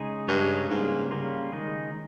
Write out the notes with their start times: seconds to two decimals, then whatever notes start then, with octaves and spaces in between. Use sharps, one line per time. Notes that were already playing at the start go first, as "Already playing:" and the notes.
Already playing: C#3 G#3 D#4 G#4
0.28 G2 C#3 G#3 D#4 G#4 C#5
0.69 G#2 C#3 G3 A#3 F4
1.11 C#3 G3 A#3 F4
1.52 D#3 G#3 D#4 G#4